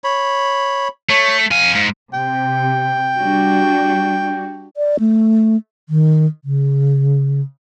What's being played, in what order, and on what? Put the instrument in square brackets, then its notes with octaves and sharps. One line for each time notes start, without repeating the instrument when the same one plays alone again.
[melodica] C#5 B5
[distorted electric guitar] A3 [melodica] C#5
[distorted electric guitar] F2 G#5 [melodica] F5
[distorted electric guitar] G#2
[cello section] C3 [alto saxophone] G5
[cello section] G3 D4 F#4
[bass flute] D5
A3
D#3
C#3